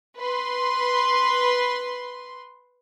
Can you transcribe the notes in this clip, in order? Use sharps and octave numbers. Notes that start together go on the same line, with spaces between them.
B4 C6